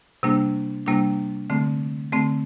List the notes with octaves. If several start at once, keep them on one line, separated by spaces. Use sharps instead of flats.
C3 G3 A#3 D4
C3 G3 A#3 D4
D3 A3 C4
D3 A3 C4